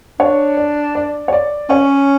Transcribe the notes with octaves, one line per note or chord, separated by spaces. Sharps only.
D4 C#5
D5
D5
C#5
D5
C#4 C#5